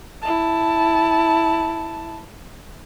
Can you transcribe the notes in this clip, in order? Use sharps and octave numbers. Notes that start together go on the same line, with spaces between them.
E4 A5